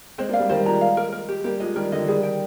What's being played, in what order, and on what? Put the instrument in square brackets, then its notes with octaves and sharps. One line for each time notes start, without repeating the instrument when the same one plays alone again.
[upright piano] G#3 C4 [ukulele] C5
[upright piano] A#3 D4
[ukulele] F5
[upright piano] G3 A#3
[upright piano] D#3 G3 [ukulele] C5
[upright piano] F3 G#3 [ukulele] A#5
[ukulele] F5
A#4
A#4
G4
[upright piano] G3 A#3 [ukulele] G4
[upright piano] F3 G#3 [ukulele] D#5
[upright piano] D#3 G3 [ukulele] A#4
[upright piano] D3 F3 [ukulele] D#5
[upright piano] D#3 G3 [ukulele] G#4
[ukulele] G5